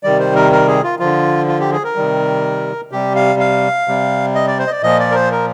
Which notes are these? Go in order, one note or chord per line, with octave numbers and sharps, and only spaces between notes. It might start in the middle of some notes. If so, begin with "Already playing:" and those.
C3 D#3 G3 D5
C5
A#4
A#4
G#4
F4
D3 F3 F4
F4
G4
G#4
A#4
C3 D#3 G3
C3 G3 G4
F5
F5
C3 G3
D#5
D5
C5
D#5
D5
A#2 F3 D#5
D5
A#4
C5
A#4